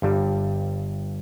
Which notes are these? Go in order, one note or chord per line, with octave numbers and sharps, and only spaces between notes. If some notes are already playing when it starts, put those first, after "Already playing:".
G1 G2 G3